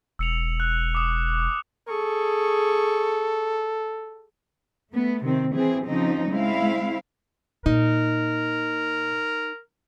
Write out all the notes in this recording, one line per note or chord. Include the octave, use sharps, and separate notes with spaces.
E1 E6 C#7 F7
F#6
D6 D#6
G#4 A4 C#6
A3 B3
C3 D#3 C4
E3 C4 G#4
C#3 F3 C4 D#4
G#3 C4 E4 F5
A#2 D#4 A#4